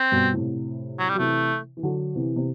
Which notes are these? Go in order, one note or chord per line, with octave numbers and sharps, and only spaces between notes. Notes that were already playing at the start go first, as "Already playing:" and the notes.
Already playing: C4
G2 B2
A2 C3
F#3
G3
F#3
C3 E3 A3
E3
D3 F#3
C3 E3
C3